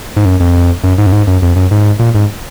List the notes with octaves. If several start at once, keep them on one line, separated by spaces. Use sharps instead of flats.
G#2
F#2
F2
F#2
G#2
F#2
G#2
F#2
F2
F#2
G#2
A#2
G#2